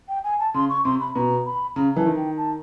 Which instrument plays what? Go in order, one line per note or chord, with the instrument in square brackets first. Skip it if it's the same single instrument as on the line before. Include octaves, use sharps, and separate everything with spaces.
[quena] G5
G#5
A5
[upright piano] C#3 [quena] C6
[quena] C#6
[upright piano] C3 [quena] C6
[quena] B5
[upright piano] B2 [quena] A#5
[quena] B5
[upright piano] C#3 [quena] A#5
[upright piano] E3 [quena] A5
[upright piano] D#3
[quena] G5
A5